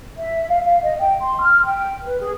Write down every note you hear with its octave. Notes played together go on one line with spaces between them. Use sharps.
E5
F5
F5
D#5
G5
C6
F6
G5
B4
G#4